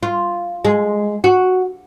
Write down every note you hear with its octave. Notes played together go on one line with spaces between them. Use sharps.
F4
G#3
F#4